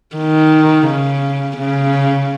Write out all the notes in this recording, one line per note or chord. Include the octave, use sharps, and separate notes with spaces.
D#3
C#3
C#3